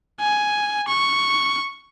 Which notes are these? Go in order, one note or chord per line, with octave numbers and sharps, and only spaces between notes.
G#5
C#6